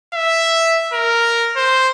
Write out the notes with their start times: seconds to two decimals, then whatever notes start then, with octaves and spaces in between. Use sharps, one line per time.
0.14 E5
0.93 A#4
1.57 C5